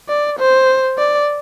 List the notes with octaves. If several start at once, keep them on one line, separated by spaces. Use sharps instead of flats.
D5
C5
D5